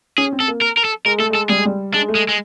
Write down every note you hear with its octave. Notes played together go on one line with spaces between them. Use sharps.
C#4 G#4
C4
A4
A#3
A#4
A#4
A4
G#3 A#4
A3 A4
G#3 A4
G3 G#4
G#3
G3
G#3 D4
A3
G#3
G#3